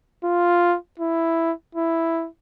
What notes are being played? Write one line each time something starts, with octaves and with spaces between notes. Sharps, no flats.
F4
E4
E4